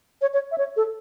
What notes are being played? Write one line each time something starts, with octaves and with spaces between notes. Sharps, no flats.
C#5
C#5
E5
C#5
A4